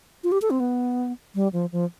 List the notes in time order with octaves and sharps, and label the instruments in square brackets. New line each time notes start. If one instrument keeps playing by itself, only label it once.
[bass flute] F4
G4
A4
C4
B3
G3
F3
F3